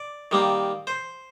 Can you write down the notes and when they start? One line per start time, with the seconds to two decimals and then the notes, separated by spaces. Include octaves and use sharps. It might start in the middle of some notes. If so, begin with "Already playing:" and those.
Already playing: D5
0.31 D#3 G3 A#3
0.87 C5